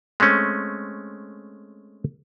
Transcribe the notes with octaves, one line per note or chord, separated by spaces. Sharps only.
G#3 A3 C4 C#4